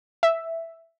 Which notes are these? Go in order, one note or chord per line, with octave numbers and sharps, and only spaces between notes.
E5